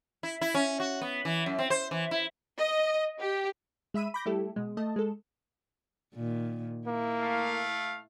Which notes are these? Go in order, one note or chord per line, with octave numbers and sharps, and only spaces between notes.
E4
E4
C#4
F#4
B3
E3
F#2
C4
C5
E3
E4
D#5
G4
G#3 E5 B5 E6 D#7
B5 D6 G6 A#6
G3 A3 E4 G4 A4
B2 G#3
A3 D#5 A5
G#3 A4
A#2 D#3
A#3 E4
A3 F5